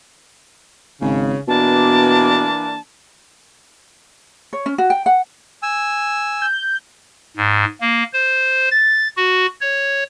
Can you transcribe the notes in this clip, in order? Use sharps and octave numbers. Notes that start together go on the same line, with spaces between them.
G#1 C#3
B2 E3 A#3 D4 A5
C#5
C#4
F#4
G5
F#5
G#5 E6
G6
G#2
A#3
C5
A6
F#4
C#5